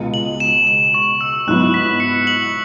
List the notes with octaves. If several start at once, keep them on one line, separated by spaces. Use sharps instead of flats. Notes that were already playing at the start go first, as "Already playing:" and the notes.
Already playing: C#2 B2 G#3
F#7
E7
E7
C#6
E6
G#2 F#3 B3 E4 F#6
B6
C#7
F#7